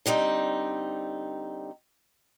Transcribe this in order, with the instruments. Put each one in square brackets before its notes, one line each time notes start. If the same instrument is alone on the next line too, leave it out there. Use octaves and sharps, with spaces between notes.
[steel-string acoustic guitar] D3 G3 C4 D#4